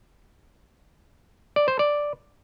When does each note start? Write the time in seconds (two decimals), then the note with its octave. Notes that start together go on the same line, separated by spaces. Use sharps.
1.56 D5
1.68 C5
1.79 D5